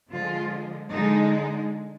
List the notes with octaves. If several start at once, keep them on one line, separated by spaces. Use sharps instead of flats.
D3 F3 G#3 F4
D3 G#3 D#4